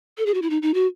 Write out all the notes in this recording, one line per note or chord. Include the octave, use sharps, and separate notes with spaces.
A4
G#4
F#4
E4
D#4
D#4
F#4